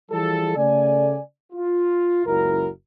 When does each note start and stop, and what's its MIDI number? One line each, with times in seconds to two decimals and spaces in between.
0.11 0.54 52
0.11 0.54 53
0.11 0.54 55
0.11 0.54 64
0.11 0.54 68
0.11 0.54 69
0.56 1.18 49
0.56 1.18 57
0.56 1.18 74
0.56 1.18 80
1.52 2.23 65
2.25 2.69 30
2.25 2.69 37
2.25 2.69 54
2.25 2.69 64
2.25 2.69 66
2.25 2.69 70